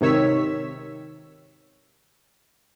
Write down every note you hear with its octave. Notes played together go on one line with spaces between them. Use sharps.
G#1 C3 D#3 C#5 E6 B6